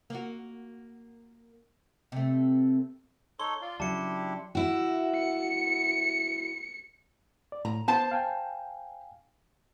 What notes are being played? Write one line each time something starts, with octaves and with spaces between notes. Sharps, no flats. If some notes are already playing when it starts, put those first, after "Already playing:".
A#3 F#4
C3 A3
D#4 A4 C#5 C6 G7
F4 D5 F5
C#3 F#3 G3 D4 E4 G4 A5 C#7
E4 F#4
C#7
D5
A2 A#5
B3 C5 A5
F5 G5 G#5